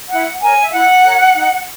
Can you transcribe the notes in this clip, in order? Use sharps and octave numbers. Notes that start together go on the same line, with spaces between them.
E4 F#5
A#4 C#5 G#5
E5
E4 F#5
A#4 C#5
D#4